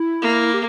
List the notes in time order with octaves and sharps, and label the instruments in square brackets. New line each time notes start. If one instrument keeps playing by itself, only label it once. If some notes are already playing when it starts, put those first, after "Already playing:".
Already playing: [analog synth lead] E4
[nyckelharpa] A#3
[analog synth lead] G4